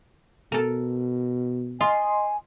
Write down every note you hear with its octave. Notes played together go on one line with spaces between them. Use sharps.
B2 A4 A#4
F4 D#5 G#5 C6